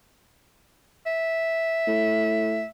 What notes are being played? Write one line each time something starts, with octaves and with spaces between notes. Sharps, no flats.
E5
A2